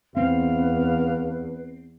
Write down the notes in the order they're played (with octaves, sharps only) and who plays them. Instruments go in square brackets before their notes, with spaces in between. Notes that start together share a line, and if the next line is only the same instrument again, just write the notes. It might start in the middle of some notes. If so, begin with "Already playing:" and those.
[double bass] E2 [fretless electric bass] C4 [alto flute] B4 [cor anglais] F5